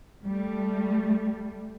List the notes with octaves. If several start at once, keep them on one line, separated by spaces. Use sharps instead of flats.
G3 A3